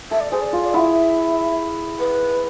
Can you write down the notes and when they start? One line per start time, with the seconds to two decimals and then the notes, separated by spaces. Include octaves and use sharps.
0.11 A4 E5
0.21 D5
0.31 G#4 C5
0.42 D5
0.53 F4
0.63 D5
0.74 E4 F#5
0.78 E5
1.99 B4